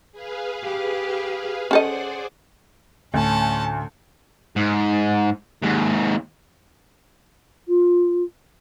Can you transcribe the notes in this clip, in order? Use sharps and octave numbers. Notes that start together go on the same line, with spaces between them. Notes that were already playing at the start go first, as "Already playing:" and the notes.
G#4 B4 F5
G4
C#4 G#4 A4 C5 D5 D#5 F#5
D2 A2 D3 C#4 A5
G#2
D#2 G#2
F4